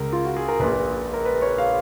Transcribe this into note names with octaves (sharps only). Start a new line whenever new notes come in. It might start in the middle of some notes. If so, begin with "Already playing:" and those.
Already playing: C#2 C#3 A#4
F4
F#4
G#4
A#4
A#1 A#2 B4
A#4
B4
C#5
F5